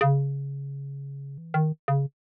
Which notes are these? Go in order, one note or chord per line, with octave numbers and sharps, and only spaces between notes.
C#3
E3
D#3
C#3